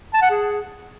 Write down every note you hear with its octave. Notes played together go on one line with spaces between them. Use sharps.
A5
F#5
G#4